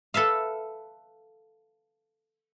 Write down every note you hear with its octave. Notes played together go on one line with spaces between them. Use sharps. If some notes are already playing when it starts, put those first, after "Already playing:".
A4 B4 E5 F5